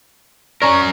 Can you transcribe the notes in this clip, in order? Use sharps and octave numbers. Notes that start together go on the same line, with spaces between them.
C#4 A#4 D5 A#5 C#6